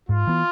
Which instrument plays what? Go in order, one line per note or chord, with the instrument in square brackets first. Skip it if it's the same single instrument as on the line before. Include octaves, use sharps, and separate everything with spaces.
[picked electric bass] G#2 [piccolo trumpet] F4
[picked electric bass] E3 B3